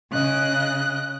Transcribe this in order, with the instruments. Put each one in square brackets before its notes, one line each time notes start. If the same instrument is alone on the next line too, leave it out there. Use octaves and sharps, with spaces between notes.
[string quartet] C#3 D#5 F#6